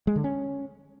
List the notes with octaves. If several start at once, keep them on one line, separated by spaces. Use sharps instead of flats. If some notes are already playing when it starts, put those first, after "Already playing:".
G#3
D3
C#4